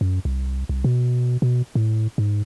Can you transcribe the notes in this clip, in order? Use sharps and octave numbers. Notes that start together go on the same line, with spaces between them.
F#2
C2
C2
B2
B2
A2
G#2